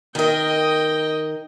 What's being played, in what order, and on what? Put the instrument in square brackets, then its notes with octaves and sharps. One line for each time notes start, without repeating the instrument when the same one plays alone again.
[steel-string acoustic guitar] D#3 A#4 [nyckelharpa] D#5 G5